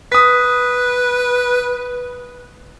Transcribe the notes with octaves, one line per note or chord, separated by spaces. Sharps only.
B4 D#6 B6